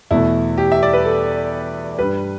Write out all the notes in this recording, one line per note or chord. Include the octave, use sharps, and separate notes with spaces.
E2 B2 A3 E4
G4
E5
D5
B4
A4
G2 G3 B4